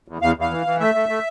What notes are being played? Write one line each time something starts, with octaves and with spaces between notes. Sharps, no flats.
E2
E2 F5
E2 F5
E3
E3
A3 E5
A3
A3